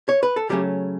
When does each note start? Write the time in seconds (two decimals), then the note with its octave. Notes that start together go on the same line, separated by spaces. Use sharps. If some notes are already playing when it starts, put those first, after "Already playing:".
0.09 C#5
0.23 B4
0.36 A4
0.49 C#3 F#3 G3 A3 C#4 G4